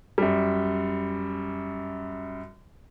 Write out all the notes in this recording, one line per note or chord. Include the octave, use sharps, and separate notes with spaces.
F#2 G3